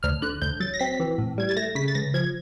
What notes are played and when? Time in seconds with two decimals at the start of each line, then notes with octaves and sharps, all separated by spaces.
0.03 D2 F6
0.22 D3 F#6
0.42 D2 G6
0.60 F#3 A6
0.74 A#6
0.79 C4 B6
1.00 E3
1.18 A2
1.38 G3 G#6
1.49 A6
1.57 A3 A#6
1.75 C#3 B6
1.88 A6
1.95 C#2 A#6
2.14 F3 G#6